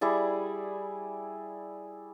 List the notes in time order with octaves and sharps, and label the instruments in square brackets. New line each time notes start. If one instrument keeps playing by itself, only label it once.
[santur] G3 E4 G#4 D5